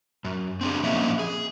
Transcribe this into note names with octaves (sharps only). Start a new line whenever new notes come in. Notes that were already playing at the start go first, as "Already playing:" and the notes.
F#2
C4 D4 G#4
F3 A#3 C#4 E4 D#5 E5
G#4